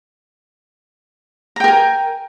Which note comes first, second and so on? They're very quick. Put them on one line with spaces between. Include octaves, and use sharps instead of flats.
A#5 G5 A#4 G#5